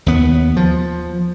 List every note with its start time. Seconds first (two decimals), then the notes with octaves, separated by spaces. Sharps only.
0.06 D#2 B3
0.57 F3